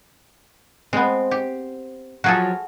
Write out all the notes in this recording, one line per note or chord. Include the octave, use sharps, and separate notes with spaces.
G#3 B3 C4
G4
F3 F#3 F#4 G#4 A4